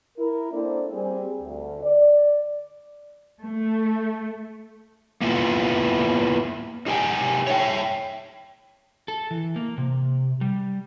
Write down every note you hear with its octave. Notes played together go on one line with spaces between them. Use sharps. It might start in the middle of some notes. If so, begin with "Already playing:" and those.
E4 A#4
A#3 C4 D4 E4 A4 C5
G3 C4 G#4
D2
D5
A3
A#3 B3 E4 F4
D#4 G4 F5 G5 G#5
C#5 E5 G5
A4
E3
A#3
C3
G3